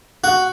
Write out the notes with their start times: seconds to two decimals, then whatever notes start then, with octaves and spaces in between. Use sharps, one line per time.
0.24 F#4